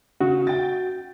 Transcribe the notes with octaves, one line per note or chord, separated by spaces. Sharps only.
C#3 F#4
G5 A6